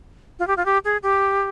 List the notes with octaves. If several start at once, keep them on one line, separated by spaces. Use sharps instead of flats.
F4
G4
F4
G4
G#4
G4